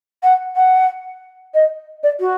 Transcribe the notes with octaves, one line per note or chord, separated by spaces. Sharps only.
F#5
F#5
D#5
D5
F#4